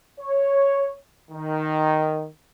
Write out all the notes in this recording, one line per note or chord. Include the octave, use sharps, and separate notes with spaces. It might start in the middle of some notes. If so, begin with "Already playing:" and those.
C#5
D#3